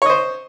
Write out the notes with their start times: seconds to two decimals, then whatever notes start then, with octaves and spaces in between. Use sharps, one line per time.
0.02 C#5
0.06 D#5
0.10 C5